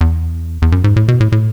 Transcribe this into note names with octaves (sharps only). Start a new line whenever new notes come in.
E2
E2
F#2
G#2
A2
B2
A2
A2